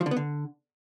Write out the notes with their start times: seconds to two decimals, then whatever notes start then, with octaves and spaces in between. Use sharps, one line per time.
0.01 F3
0.06 D3
0.11 B3
0.17 D3